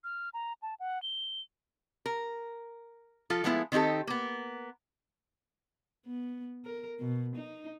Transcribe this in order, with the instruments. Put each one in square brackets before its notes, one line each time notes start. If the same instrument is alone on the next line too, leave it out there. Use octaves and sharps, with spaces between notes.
[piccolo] F6
A#5
A5
F#5
G7
[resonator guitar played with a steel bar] A#4
F3 F4 A4
F3 G#3 A3 B3 D#4 E4
D#3 C4 D#4 G4 A4
A#3 B3
[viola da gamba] B3
A#4
B2
D#4